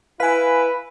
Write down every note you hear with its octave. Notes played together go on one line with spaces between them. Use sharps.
E4 B4 F5 G#5